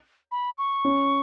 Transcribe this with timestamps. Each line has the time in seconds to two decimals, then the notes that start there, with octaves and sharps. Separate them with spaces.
0.32 B5
0.58 C#6
0.85 C#4